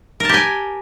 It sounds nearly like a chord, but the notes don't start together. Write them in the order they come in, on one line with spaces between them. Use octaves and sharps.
A#4 A5 G4 G#5